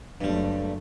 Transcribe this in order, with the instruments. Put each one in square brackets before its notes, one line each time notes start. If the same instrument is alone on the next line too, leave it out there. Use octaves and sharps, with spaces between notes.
[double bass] F#1 A3 [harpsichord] G2 G3